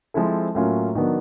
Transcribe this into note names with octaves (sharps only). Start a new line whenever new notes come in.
F3 G#3 C4 E4 A4
A2 F#3 A#3 C#4 F4
D#3 F#3 B3 D4